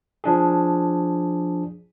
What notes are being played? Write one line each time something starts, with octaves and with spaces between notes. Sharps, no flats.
F3 D4 G#4